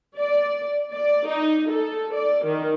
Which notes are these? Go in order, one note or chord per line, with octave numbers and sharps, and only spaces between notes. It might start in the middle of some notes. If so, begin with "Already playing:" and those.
D5
D5
D#4
A4
D5
D#3